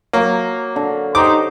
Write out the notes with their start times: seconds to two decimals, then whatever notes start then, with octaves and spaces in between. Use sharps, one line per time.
0.13 F#3 A#3
0.76 D3
1.15 D#4 G4 C5 D6